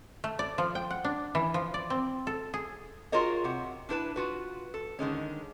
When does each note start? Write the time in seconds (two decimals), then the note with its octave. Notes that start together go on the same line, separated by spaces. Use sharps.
0.24 A3
0.39 D5
0.58 F3
0.75 G5
0.90 F#5
1.05 D4
1.35 E3
1.54 F3
1.74 D5
1.90 C4
2.27 A4
2.54 G#4
3.12 F4 F#4 G#4 A#4 C#5 D#5
3.44 C3 F#4
3.89 D4 E4 B4 A5
4.16 F4 F#4 B4
4.74 A4
4.99 D3 D#3 G#3 C#4